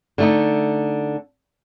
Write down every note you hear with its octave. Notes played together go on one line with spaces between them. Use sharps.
D3 A3 D#4